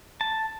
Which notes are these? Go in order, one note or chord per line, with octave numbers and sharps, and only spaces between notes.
A5